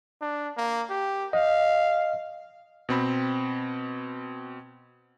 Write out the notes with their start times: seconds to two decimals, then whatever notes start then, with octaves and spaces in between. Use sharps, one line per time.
0.21 D4
0.57 A#3
0.90 G4
1.33 D#5 F5
2.89 B2 C4 B5